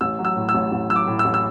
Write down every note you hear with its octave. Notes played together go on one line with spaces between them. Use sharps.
A1 E6
F#3
E6
A2
E6
A1
A1
F#3 E6
D6
A2
E6
A1
E6